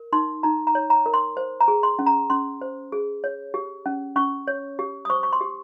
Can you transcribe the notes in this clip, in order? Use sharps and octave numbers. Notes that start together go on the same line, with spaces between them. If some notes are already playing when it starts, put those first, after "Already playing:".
Already playing: A#4
D#4 C6
D#4 A#5
A#5
C#5
A#5
A#4
C6
C5
A#5
G#4
C6
C#4
A#5
C#4 C6
C5
G#4
C#5
G4
C#4
C#4 C#6
C#5
G4
D#6
C5 C#6
C#6
C6
G4